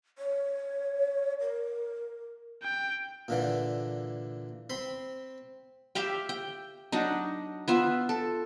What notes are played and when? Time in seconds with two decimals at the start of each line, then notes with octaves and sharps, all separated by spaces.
0.18 C#5
1.40 A#4
2.63 G5
3.28 A#2 D3 E3
4.70 C4 B5 C6
5.95 G4 E5 F5 G5
6.29 G5
6.92 F#3 D4 D#4
7.68 B3 F4 E5
8.09 A4